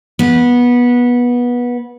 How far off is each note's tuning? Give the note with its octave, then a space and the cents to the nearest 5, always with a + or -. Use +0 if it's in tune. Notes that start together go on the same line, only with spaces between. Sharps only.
B3 -20